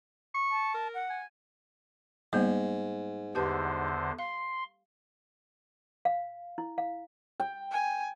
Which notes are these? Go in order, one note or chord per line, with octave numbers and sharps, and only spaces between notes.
C#6
A5
A#4
F#5
G#5
G#2 G3 A#3 B3
E2 D3 G4 B4 C5 A5
F5 C6
F5
E4
F5
G5
G#5